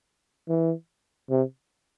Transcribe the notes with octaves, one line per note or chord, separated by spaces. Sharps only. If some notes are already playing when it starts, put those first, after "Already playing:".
E3
C3